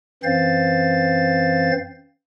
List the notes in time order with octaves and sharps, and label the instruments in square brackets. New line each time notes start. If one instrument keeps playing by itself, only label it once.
[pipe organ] F#2 E3 C4 C5 F5 A6